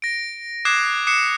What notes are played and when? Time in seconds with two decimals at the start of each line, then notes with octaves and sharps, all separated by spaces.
0.02 A#6 D7
0.65 D6 D#6 F#6 G#6 C7 E7
1.07 D6 D#6 F#6 C7 C#7 E7